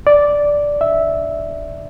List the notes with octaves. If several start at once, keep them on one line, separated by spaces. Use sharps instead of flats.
D5
E5